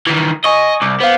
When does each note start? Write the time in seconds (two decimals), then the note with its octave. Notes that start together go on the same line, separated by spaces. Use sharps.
0.07 D#3 E3
0.44 D#5 G#5 C#6 D#6
0.82 C2 D6
1.01 B3 C5 F5